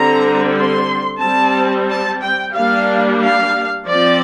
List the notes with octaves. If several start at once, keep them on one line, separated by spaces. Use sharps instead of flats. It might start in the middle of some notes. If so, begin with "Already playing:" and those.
Already playing: D3 G3 C4 A#5
C6
G3 C4 A5
A5
G5
G3 A#3 D4 F5
F5
F3 C4 D5